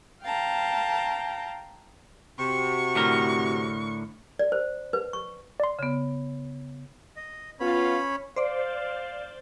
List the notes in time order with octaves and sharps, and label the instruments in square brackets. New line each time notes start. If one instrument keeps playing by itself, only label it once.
[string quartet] F5 G5 A5 A#5
[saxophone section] C3 [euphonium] F#4 [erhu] C#6
[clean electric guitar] A2 D3 A#4
[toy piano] D5
C5
B4
C#6
[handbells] D5 C6
[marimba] C#3 B3
[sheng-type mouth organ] D#5
[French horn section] B3 F4 [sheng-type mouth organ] C#4 C#5 B5
[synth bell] C5 D5 [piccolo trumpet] F5